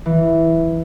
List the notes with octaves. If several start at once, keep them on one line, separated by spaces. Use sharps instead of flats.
E3